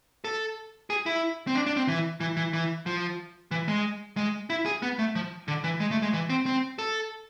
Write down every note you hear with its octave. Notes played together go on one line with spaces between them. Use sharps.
A4
G#4
E4
C4
D4
D4
C4
E3
E3
E3
E3
F3
E3
G#3
G#3
E4
G#4
B3
A3
F3
D3
E3
G#3
A3
G#3
E3
C4
C4
A4